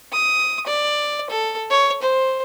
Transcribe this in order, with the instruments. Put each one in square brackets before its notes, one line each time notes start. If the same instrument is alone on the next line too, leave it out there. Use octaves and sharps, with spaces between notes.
[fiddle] D#6
D5
A4
C#5
C5